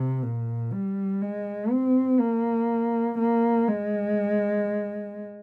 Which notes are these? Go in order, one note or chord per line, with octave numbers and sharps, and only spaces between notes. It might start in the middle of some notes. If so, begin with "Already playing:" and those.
Already playing: C3
A#2
G3
G#3
C4
A#3
A#3
G#3